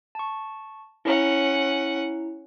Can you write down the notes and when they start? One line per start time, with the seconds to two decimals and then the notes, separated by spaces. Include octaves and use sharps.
0.15 A5 C#6
1.05 C#4 E4 F#5 A#5